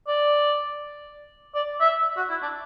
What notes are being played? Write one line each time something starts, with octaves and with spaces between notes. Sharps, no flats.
D5
D5
E5
F#4
E4
D4